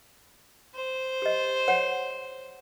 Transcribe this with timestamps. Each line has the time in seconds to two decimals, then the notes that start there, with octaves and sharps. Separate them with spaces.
0.75 C5
1.22 G4 D#5
1.68 C#5 F#5